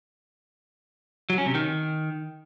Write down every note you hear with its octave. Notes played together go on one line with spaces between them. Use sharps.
F#3
C#4
C3
D#3